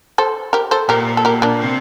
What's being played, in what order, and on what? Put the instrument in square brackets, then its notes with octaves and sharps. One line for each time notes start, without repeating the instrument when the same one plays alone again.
[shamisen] A4 C5
G4 A#4
A4 C5
[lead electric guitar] A#2 [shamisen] G4 A#4
[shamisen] A4
G4 A#4
A#3 D4
[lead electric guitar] C3